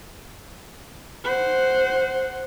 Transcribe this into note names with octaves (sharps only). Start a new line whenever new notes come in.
C5 F#5